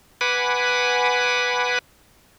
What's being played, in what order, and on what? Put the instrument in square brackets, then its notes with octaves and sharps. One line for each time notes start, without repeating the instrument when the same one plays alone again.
[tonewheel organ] B4 F#5 G#5 B5 D6